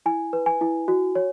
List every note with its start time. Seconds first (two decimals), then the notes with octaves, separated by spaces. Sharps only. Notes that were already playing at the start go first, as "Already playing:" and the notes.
0.06 E4 G#5
0.33 B4
0.46 G#5
0.61 E4
0.88 F#4
1.15 C#5